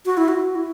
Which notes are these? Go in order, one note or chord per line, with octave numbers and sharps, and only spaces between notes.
F#4
E4
F#4
E4